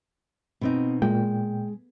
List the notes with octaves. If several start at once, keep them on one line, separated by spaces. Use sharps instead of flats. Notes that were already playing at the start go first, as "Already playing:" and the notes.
B2 C4 D#4
A#2 G#3 G5